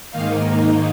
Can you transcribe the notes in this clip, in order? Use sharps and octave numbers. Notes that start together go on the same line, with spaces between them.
G#2 D#3 A#3 D#4 F5